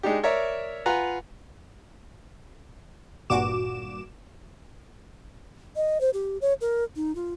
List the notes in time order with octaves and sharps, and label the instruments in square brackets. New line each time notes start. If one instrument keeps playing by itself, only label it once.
[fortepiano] G#3 D4 D#4 G4
A#4 C#5 D5 E5 A#5
F4 B4 F5 F#5 G#5 A#5
[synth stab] G#1 G2 A#2 F#4 D6 E7
[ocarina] D#5
C5
G4
C#5
A#4
D#4
F4